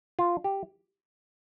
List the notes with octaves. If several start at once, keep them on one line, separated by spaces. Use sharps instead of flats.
F4
G4